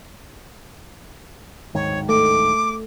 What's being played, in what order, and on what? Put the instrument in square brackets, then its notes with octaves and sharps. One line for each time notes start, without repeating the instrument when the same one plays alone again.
[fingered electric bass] D1 G#2 D#3 [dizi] C#5
[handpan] A3 [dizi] D6